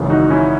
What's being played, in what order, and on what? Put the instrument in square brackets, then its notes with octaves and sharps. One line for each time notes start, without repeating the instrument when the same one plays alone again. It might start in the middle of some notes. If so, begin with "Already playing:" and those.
Already playing: [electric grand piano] G#1 F#2 C#3 E3
D#4 F#4
C#4 E4